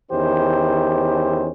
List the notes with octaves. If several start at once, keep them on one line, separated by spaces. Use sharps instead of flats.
E2 D#3 C#4 G4 C5